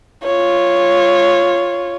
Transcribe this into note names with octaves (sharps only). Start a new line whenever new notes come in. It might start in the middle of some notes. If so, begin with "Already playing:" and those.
F4 C#5